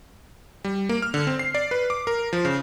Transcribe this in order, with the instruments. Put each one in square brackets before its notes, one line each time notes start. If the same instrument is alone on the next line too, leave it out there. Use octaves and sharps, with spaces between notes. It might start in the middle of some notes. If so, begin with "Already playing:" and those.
[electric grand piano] G3
A#3
F6
D3
C4
C7
D5
B4
D6
A#4
F3
C#3